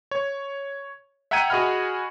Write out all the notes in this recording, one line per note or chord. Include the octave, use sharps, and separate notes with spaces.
C#5
E5 F#5 G5 A#5 G#6 D#7
F#4 G#4 D#5 F#5 B5 F6